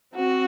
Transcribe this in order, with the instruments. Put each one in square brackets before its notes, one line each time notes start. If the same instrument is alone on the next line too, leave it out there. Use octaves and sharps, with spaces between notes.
[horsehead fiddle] C4 [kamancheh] F#4